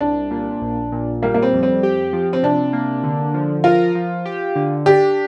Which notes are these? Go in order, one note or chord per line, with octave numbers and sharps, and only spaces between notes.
C2 D4
A#2
A#1
A#2
G3 A#3
A#3
C4
F2
C4
G4
F3
C4
C3 D4
A#3
D3
F3
F4 A#4
F3
G4
D3
D4 G4